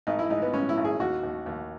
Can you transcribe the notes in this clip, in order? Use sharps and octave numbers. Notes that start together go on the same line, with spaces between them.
G#1 D#4
E4
G#2 D#4
B3
G#2 C#4
E4
G#1
G#4
D#2 F#4
D#2
D#2